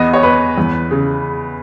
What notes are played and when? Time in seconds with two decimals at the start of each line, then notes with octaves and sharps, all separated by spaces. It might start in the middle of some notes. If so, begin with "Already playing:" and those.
Already playing: E2 B3 D#5
0.13 C#5
0.23 B3 B4
0.58 E2
0.91 C#3